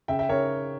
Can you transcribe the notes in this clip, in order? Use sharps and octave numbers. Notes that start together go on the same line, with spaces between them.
C#3 E5 G5
E5 G5
C#3 A#4 C#5